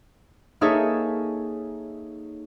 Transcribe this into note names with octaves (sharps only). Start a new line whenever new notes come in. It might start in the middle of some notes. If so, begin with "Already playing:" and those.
A#3 D#4 G#4 A4 C#5 E5